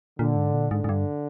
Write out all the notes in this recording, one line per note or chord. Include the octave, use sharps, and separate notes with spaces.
A#2 D3
G#2
A#2
G#2 D3
G#2
G2